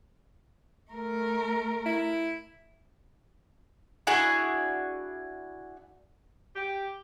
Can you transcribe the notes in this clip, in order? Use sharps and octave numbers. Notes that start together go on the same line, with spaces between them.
A3 A#4
E4
D4 E4 F#4 G#4
G4